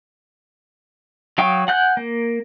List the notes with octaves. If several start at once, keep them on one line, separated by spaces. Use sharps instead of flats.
F#3 F5 G5 C#6 D#6
F#5 G#5 F#6 G6
A#3